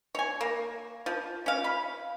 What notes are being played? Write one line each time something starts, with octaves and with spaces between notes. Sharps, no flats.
C#5 G#5
A#3
F3
C#4 F5
B5